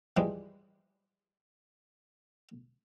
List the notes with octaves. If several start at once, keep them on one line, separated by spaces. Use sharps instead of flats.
E3 F3 G3 G#3